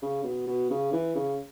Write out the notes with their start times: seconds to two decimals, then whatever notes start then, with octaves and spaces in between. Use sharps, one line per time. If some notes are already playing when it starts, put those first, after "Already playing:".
0.02 C#3
0.24 B2
0.47 B2
0.70 C#3
0.93 E3
1.15 C#3